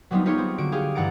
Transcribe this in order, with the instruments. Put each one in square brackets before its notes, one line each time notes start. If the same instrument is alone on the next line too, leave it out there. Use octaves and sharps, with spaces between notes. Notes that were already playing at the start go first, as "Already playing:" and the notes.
[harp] F#3 G3 B3 C4 D#4 F4
B3 D#4 F4 G4 G#4 C#5
C4
D3 F#4 D7
G4 G#4 F5
G2 E3 F#5 A#5 A6 D7